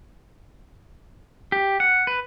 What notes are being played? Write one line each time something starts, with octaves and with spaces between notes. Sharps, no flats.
G4
F#5
B4